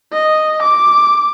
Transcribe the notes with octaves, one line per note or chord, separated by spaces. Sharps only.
D#5
D6